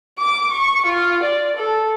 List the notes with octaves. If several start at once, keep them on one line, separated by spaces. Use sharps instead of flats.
D6
C#6
F4
D5
A4